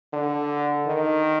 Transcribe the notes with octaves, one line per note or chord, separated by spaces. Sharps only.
D3
D#3